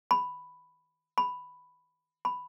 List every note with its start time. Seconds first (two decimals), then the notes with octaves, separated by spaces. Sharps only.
0.11 B5
1.18 B5
2.25 B5